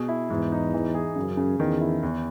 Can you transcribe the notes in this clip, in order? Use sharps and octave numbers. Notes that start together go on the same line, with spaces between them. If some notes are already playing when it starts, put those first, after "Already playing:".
Already playing: B2 G#4
E4
E2 G#2
D#4
E3
G#4
F#2 C#3
C#3
E2 D#3
E4
E2